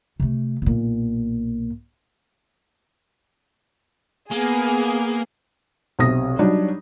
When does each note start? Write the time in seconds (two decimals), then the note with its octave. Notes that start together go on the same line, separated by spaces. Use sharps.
0.20 C3 A3
0.62 B1 A#2
4.31 A#3 B3 G#4
5.99 B1 C3 D#6 A#6
6.39 F#3 G3 D4 D#4